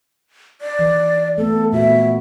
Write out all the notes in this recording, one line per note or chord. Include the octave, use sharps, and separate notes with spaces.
D5
D#3 E3
A3 B3 A4
A#2 B3 F#4 E5